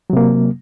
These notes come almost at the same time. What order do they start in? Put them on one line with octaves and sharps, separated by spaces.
F#3 C3 A#3